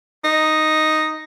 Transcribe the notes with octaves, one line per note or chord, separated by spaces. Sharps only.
D#4